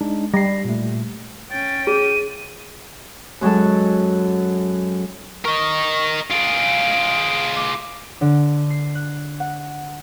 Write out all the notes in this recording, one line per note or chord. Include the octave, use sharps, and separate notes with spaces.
G#3 D4 D#4
G3 A#6 C7
A#2 A3
C#4 G5 A6
G#4 D#7
F#2 F#3 G#3 A4
A#4 D#5 C#6
F4 G#4 D7
D6
D3
C7
F#6
F#5